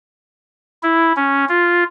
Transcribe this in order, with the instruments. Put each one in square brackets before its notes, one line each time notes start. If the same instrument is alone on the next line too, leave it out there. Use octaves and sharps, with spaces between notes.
[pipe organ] E4
C#4
F4